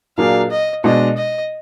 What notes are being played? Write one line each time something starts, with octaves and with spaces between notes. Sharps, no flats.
A#2 F#3 A#3 D4 G#4 F5
D#5
B2 G#3 D4 D#5
D#5